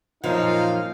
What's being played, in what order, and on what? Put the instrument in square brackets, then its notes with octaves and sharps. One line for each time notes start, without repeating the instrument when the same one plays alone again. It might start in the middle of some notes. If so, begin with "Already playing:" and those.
[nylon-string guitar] F#2 F3 [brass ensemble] A#2 D#4 F5